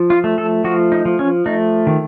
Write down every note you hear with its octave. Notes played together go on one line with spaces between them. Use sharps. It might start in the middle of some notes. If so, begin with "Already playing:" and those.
Already playing: F3
F4
A3
A4
F3 F#4
D#4
F3
C#4
A3 D#4
D#3